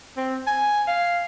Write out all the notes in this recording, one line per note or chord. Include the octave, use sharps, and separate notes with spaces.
C4
G#5
F5